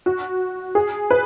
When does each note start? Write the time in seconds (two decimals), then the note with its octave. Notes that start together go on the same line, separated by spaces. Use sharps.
0.06 F#4
0.75 G#4
1.10 B4